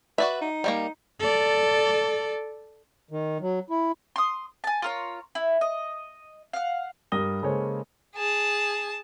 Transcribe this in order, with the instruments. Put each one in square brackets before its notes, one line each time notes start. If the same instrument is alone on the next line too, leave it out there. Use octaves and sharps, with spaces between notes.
[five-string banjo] F#4 D5 E5 [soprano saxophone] B4
[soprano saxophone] D#4
[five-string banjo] G3 A3 A#3
[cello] A4 D5
[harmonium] D#3
F#3
E4
[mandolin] C6 D#6
G#5 A5
F4 A#4 C#5
E4
D#5
F5 F#5
[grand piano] G2 G3 A#4 D#6 A#6 G7
C#3 G#3 A#3 A4 C5 C#5
[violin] G#4 A5